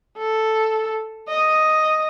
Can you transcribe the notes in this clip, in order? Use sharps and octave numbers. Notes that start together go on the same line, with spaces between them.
A4
D#5